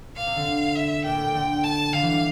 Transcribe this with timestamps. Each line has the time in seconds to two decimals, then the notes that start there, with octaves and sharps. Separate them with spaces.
0.16 A#2 F5
0.26 C3
0.36 D3
0.75 E5
1.05 A#2 G5
1.14 A2
1.24 A#2
1.34 D3
1.64 A5
1.93 D3 F5
2.03 E3
2.12 G3